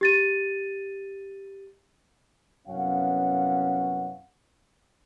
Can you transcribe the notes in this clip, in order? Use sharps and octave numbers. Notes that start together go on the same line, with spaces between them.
G4 A6 D#7
C2 F#2 B3 C#4 F5 F#5